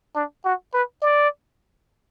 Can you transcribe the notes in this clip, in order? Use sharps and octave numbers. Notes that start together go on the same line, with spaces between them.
D4
F#4
B4
D5